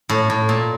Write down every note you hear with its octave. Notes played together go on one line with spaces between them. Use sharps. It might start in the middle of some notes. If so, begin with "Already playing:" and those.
A2
A2
A#2